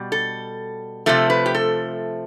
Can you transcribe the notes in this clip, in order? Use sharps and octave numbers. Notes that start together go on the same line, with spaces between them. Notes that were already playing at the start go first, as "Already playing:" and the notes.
Already playing: B2 G3
A4
C3 F3 A3 A4
B4
G4
A4